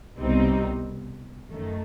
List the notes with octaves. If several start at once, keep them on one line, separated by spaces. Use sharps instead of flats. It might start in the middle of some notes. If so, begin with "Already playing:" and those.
C2 B2 G3 C4 D#4
F#2 D#3 A3